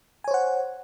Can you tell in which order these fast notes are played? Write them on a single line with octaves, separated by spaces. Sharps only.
G#5 C#5 C5 F#5